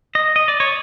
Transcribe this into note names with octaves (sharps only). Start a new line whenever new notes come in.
D#5
D#5
D5
C#5